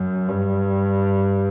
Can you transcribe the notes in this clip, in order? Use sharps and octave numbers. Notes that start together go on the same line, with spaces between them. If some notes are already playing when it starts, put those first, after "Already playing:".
Already playing: F#2
G2